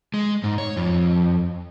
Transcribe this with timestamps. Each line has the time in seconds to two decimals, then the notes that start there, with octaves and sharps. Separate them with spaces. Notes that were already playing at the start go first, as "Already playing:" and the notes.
0.14 G#3
0.44 G#2
0.58 C#5
0.77 F2